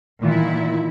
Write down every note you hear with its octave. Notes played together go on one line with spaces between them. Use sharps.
A#2 D#3 E3 E4 F4